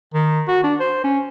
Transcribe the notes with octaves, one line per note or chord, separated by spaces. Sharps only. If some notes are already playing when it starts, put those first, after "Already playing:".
D#3
F#4
D4
C5
C#4